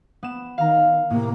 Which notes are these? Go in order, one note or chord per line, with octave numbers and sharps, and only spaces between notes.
B3 E7
D#3 F5 A#5
A2 C3 A#3